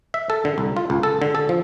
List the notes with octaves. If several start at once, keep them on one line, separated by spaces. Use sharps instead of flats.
E5
A4
D3
C2
F4
C#2
A4
D3
A4
F3